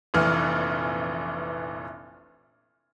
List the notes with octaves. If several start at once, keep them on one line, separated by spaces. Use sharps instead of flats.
F1 A#1 E3 F6